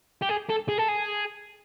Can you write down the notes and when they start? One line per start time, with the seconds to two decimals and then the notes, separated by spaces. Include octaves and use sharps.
0.22 G4
0.29 G#4
0.49 A4
0.69 G#4
0.78 A4
0.88 G#4